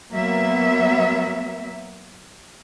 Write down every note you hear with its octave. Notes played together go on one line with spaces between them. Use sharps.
F#3 A#3 B3 E5